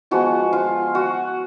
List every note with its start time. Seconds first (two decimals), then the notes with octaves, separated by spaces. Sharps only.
0.11 F3 G#3 B3 F4 F#4
0.53 F4
0.95 F#4